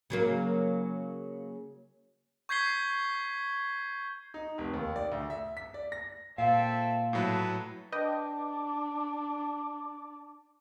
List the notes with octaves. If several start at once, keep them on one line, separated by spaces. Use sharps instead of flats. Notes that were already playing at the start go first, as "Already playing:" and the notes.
C#3 F#3 A#3
C#6 G6 G#6 B6 C7 G7
D#4
F1
D#2
D5
D2
E5
B6
D5
A#6
A#2 C4 A4 E5 F5
A2 F#3 A4 B4
D4 B4 D#5 G5 D6